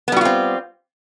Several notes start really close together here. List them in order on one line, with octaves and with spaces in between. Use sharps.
B3 G3 F#4 F4 C4